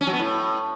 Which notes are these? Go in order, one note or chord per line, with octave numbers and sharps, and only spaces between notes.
C#4
F#3
B3
A2